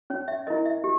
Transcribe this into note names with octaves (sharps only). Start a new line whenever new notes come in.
C#4 C#5
E5
E4 A#4 D#5
E5
G4